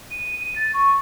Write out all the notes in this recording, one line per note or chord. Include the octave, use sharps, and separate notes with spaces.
D#7
D#7
A6
C#6